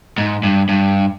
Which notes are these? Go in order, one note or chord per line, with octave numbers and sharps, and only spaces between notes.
G#2
G2
G2